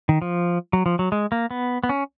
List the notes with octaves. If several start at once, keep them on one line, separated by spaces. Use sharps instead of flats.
D#3
F3
F#3
F3
F#3
G#3
A#3
B3
B3
C#4